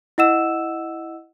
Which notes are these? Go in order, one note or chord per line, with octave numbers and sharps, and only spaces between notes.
E4 D#5 F#5 E6 E7